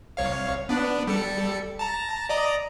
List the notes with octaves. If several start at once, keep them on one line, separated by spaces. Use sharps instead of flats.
C2 C#5 F5
B3 D4
G3 A4 C#7
A5 A#5
D5 D#5 A#5